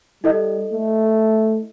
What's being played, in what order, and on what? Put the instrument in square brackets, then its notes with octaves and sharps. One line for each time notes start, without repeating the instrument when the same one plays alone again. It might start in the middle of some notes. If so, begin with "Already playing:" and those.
[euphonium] G3 [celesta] E4 A4 D#5
[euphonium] A3